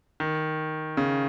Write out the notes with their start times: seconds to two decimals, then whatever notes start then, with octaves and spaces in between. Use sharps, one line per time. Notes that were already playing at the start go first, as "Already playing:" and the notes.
0.20 D#3
0.97 C#3